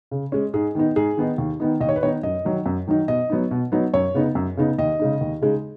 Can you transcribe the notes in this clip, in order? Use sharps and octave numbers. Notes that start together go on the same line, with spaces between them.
C#3
G#3 C#4
G#2 G#4
D#3 B3 D#4
G#2 G#4
D#3 B3 D#4
D#2
D#3 B3 D#4
D#2 D#5
C#5
B4
D#3 B3 D#4 C#5
F#2 D#5
D#3 F#3 D#4
F#2
D#3 F#3 D#4
B2 D#5
F#3 B3 D#4
B2
F#3 B3 D#4
F#2 C#5
C#3 B3 D#4
F#2
C#3 B3 D#4
D#2 D#5
C#3 G#3 D#4
D#2
C#3 G#3 D#4